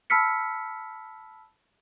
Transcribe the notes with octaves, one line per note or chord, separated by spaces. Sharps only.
A5 B5 E6 F6 B6 C#7